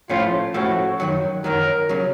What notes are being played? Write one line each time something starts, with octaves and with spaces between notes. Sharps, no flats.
A2 F3 A3 C#4 F4
A2 F3 A3 C#4 F#4
F#2 D#3 F#3
F#2 D#3 F#3 A#4
C#3 F#3